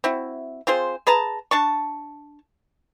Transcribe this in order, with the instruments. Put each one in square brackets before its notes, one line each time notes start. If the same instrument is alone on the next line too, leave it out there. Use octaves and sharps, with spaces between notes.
[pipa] C4 E4 F#4
C4 F4 G#4 C5
G#4 B4 A5 A#5
D4 A5 C#6